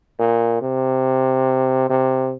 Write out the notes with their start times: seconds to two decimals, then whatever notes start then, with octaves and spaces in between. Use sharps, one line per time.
0.19 A#2
0.62 C3
1.90 C3